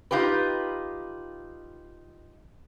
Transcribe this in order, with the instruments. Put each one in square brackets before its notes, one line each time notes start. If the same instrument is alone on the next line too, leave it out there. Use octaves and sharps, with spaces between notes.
[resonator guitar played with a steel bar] D#4 F4 G4 B4